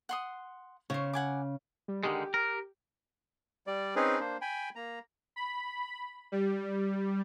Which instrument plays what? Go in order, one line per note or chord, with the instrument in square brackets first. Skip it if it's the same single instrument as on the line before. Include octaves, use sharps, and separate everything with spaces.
[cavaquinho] F#5 C6 D#6
[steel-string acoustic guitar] C#3 [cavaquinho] C5 C#5
[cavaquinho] F#5 G#5 D6
[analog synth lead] G3
[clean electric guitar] D3 D#3 G#3 [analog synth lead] G4
[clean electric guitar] A#4
[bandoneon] G3 D5
C4 C#4 D#4 G#4 B4
A#3 D4 C5
G5 G#5 B5
A#3 A#5
[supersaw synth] B5
G3